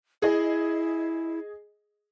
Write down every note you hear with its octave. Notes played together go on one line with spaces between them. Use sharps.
E4 G#4 D#5